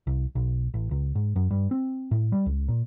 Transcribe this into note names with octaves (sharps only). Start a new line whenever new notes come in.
C2
B1
A1
C#2
G#2
F#2
G2
C4
A2
G3
C#2
A#2